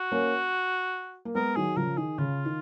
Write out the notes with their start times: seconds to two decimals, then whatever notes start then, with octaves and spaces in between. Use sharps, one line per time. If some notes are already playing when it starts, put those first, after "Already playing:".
Already playing: F#4
0.12 A#3 C#4
1.25 A#3
1.35 G#3 B3 A#4
1.56 D#3 F#3 G#4
1.77 C#3 F3 A#4
1.97 D#3 G#4
2.18 C#3 F4
2.45 D#3